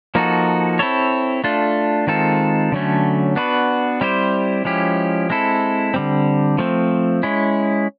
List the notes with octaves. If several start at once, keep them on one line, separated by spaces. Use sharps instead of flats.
F3 A#3 D#4 F#4 A4
C4 E4 A4 C#5
A3 D4 F4 A4
D#3 G#3 C4 F4 A4
D3 F#3 A3 C#4
B3 D4 F#4 B4
G3 C4 E4 G4 C5
F3 G#3 C#4 E4 G4
G#3 C4 E4 A4
D3 G3 C4
F3 A3 C4
G#3 C#4 E4